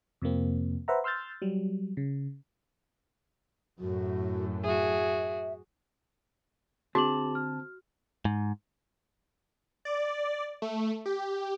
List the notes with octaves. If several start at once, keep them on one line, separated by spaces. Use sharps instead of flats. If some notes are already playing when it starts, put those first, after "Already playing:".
F2 C3 F3 A#3 C4
B4 C5 E5 F#5 A#5
C6 E6 F6 G6 A6
F#3 G3
C#3
F#2 A2 A3 F#4
F#4 G#4 E5
D3 C4 F#4 G#4 A5 D6 F#7
F6
G#2
D5
A3
G4